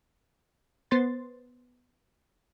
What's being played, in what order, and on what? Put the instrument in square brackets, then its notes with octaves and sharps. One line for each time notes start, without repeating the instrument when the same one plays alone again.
[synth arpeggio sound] B3 C5 C6 A6